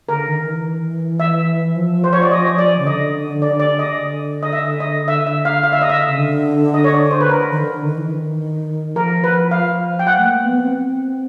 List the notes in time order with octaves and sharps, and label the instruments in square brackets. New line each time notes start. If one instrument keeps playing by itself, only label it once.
[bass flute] D3 [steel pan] A#4
[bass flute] D#3
E3
[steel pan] E5
[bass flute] F3
[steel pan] C5
C#5
D5
D#5
D5
[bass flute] C#3
[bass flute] D3 [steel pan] D#5
[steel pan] D5
D5
D#5
[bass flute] D3
[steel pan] D#5
E5
D#5
E5
E5
F5
F5
E5
D#5
E5
[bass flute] C#3
D3
[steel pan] D#5
C#5
D5
C5
B4
A#4
[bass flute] D#3
D3
D#3
E3
D#3
[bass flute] F3 [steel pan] A#4
[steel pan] B4
F5
G5
[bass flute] F#3 [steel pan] F#5
[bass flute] A3
A#3
B3
C4